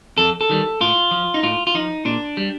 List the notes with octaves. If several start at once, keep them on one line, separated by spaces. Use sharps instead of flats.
F2 A4
A4
D#3 G3
A2 F4
F3
D#4
A2 F4
F4
F3 D#4
A#2 D4
G3